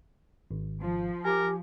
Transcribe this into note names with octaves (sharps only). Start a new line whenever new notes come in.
G#1
F3
G4 A#4 G#5